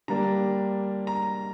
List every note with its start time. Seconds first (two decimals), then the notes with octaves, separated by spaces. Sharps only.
0.08 D3 G3 A#3 D4 A#5
1.07 A#5